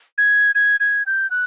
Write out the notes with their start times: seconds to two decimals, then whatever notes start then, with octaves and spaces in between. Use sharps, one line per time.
0.18 G#6
0.55 G#6
0.80 G#6
1.06 G6
1.31 F#6